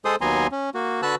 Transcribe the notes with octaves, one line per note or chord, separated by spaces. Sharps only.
G#3 G#4 A4 C5 C6 D#6
D#2 F#3 B3 G#5 A#5 C6
C#4
A#3 F#4
D3 F#4 B4 A5 E6 F#6